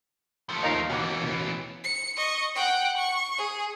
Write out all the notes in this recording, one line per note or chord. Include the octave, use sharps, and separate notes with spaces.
F3 A3
D#2 D#4 F4 A#4 F5 A#5
B2 E3 C#4 F#5 D6
B2
C#7
D#5 C#6
F#5 G5
C#6
G#4